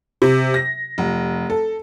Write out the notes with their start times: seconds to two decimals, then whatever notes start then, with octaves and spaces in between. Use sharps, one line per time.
0.22 C3
0.54 A#6
0.98 F1
1.50 A4